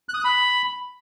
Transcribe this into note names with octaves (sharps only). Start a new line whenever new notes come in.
F#6
D#6
F#6
B5